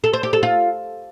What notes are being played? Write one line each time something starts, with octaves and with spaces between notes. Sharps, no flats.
A4
C5
G4
A4
F4